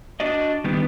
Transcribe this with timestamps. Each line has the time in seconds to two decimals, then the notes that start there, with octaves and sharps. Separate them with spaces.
0.20 D4 F#4 D5 D#5
0.64 D#3 G3 B3 D4